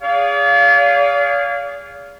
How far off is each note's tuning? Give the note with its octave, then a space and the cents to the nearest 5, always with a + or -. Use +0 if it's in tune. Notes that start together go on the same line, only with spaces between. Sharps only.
G#4 -20 D5 -45 F5 +0